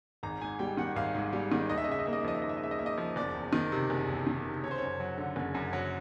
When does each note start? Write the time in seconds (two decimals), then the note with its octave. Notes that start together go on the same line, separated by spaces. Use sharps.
0.23 G#1 A#5
0.41 G#2 G#5
0.59 G3 G5
0.77 D#3 F#5
0.96 G#1 F5
1.15 G#2
1.33 G3
1.52 D#3
1.70 D#2 D#5
1.78 E5
1.84 D#5
1.88 C#3 E5
1.99 D#5
2.06 A#3 E5
2.13 D#5
2.21 E5
2.24 F3 D#5
2.35 E5
2.42 D#2 D#5
2.49 E5
2.57 D#5
2.62 C#3 E5
2.71 D#5
2.79 A#3 E5
2.86 D#5
2.98 F3
3.16 F#1 D5
3.34 E2
3.53 D#3
3.72 C3
3.90 F#1
4.08 E2
4.27 D#3
4.45 C3
4.63 F#1 C#5
4.71 C5
4.78 F#2 C#5
5.00 F#3
5.18 D3
5.36 F#1
5.54 F#2
5.73 F#3